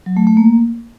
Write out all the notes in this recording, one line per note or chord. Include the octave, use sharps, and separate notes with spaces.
F#3
A3
A3
A#3